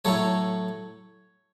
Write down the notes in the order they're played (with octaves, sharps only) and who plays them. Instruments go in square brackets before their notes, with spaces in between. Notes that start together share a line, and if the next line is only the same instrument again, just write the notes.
[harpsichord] A2 F#3 A3 C#5